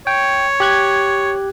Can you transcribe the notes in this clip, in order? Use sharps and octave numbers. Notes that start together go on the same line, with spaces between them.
C#5 G5
G4 F#6 G#6